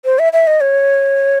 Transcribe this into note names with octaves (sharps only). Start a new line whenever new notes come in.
C5
E5
E5
D#5
C#5